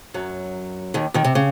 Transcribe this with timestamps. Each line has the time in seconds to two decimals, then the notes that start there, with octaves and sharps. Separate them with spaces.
0.14 F#2 F#3
0.94 D#2 D#3
1.14 D#2 D#3
1.24 C3
1.35 C#3